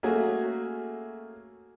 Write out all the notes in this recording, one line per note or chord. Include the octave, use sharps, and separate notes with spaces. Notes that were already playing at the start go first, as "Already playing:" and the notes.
A3 A#3 C#4 F#4 G#4